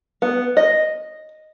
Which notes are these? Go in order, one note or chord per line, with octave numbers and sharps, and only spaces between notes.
B3
D#5